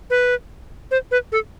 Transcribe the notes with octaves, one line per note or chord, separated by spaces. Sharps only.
B4
C5
B4
A4